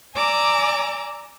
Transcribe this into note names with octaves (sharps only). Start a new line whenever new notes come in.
D5 G#5 A#5 D6 E6